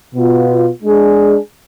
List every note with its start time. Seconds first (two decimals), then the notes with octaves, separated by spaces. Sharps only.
0.14 B2 B3 F4
0.82 G#3 D4 G#4